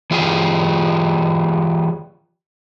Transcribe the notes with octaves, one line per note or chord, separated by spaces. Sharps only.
E3 F4 G4 G#4